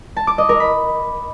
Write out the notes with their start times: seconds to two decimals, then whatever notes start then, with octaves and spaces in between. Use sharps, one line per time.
0.16 A5
0.27 D6
0.38 D#5
0.49 A#4
0.60 B5